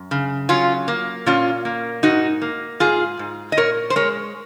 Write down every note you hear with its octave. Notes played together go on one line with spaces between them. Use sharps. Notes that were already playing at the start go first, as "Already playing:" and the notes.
Already playing: F#2
C#3
F#3 C#4 F4
A#3
A#2 C#4 F4
A#3
G#2 D#4 F#4
A#3
G#2 F4 G#4
G#2
D#5
A#2 A#4 C#5
C5
G#3 A#4 C#5